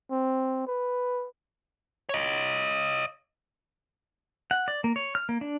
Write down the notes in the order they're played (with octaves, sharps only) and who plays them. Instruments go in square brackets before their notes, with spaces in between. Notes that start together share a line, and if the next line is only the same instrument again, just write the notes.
[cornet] C4
B4
[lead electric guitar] C#5 D#5
[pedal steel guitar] F#5
D5
A#3
C#5
F6
A#3
D4